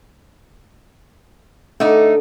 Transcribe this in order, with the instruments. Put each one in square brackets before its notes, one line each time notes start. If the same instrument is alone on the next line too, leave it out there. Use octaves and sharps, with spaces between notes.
[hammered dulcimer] D3 D6 [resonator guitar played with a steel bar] A3 D#4